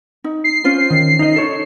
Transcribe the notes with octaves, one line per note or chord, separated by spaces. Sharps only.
D#4
C7
C#4 F4 C5
D#3
D#4 D#5
A4 C#5